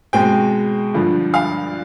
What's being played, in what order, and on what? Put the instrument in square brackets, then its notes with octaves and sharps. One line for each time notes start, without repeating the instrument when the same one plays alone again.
[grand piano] B2 G#3 C4 G5
G2 D3 F3
F5